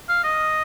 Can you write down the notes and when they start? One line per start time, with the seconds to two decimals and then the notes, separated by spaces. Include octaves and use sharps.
0.09 F5
0.24 D#5